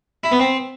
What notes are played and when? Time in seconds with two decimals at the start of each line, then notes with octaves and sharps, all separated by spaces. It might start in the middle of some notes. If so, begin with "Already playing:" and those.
0.24 E4
0.32 B3
0.40 C4